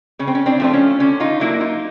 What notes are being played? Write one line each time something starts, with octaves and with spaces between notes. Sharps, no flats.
C#3 C#4
C4
C#4
C4 D4
F3 A3 C4
C#4
D3 C#4
D#4 F4
F#3 A#3 D4 E4
D#4 F4